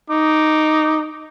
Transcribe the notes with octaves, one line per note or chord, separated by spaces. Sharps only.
D#4 D6